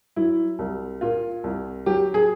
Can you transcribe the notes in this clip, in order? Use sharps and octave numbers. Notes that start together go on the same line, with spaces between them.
F#3 E4
C2
A#2 F4
C2
F#3 G4
G#4